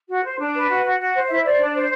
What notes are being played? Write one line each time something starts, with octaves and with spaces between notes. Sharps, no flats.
F#4
C5
D4
B4
F#4
F#4
F#4
C5
E4 E5
C5 D5
D4
C5